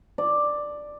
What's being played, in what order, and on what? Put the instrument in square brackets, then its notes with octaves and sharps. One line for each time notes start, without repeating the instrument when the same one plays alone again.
[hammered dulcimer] D5